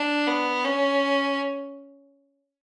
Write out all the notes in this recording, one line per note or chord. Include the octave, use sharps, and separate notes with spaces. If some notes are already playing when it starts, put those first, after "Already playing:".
Already playing: D4
B3
C#4